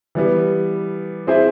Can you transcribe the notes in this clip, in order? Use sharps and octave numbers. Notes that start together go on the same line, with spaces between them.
E3 G3 B3
C4 E4 G#4 C5 E5